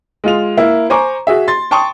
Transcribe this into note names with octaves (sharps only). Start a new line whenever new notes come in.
G#3 F4 F7
A#3 E4
C5 G#5 A#5 C#6 D6
F#4 G#4 E5
C6 A6
G5 A5 C6 C#6 D#6